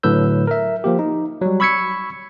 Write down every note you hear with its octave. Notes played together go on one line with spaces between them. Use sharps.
A2 D3 F#3 B4 E6 G6
A#4 E5
F3 A#3 G4
D#4
F#3 G3
B5 C#6 E6 G#6 B6 C#7